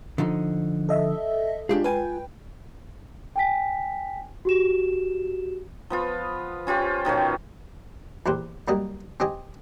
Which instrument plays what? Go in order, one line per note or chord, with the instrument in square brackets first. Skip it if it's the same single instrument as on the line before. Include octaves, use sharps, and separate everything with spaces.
[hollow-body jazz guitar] D3 F3 D#4
[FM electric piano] A4 D#5 E5
[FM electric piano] G#3 F4 [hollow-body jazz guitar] D4 G4 G#4
[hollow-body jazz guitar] F4 G#5 [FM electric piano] B4 G5
[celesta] G5 G#5 B6
F#4 G4 E7
[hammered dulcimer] F3 B3 F4
C#4 F4 G4 C5
B2 D#3 F3 C#4
[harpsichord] E2 A#2 G4 C5
F#2 G3 A#3 D#5
C4 G4 D#5 G#5